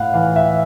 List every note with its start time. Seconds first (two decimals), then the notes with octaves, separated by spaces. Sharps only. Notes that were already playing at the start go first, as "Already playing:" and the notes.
Already playing: A2 F5 F#5
0.14 E3 F5
0.36 E5